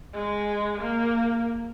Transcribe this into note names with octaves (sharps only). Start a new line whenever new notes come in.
G#3
A#3